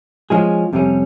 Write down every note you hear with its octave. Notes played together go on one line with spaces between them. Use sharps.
F3 G#3 C#4 G#4
F2 C3 G3 C#4